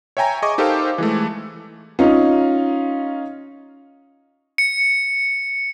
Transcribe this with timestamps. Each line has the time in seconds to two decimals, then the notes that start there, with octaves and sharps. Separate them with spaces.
0.17 C#5 E5 G5 G#5 A#5
0.42 G#4 D#5 G#5 C#6 D6
0.58 D#4 G4 A4 A#4 C5 F5
0.98 E3 G#3 A3
1.99 C#4 D#4 F4 F5
4.58 C#7